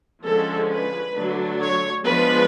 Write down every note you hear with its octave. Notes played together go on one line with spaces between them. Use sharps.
D3 F3 G#3 C#4 A4
B4
D3 F#3 A3 D4
C#5
F3 G#3 B3 D4 B4